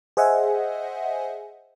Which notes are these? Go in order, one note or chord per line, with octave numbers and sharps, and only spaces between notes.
G#4 C5 D#5 E5 F#5 G#5